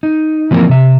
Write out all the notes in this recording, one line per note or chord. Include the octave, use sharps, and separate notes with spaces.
D#4
E3 F3 A#3 C4 A#4
C3 E5